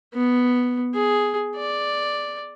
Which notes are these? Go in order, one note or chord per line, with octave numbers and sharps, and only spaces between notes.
B3
G#4
D5